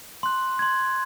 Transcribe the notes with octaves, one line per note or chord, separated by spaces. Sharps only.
C6 F#6
C6 G#6